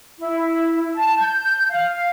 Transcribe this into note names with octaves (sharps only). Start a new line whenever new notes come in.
E4
A5
G6
F5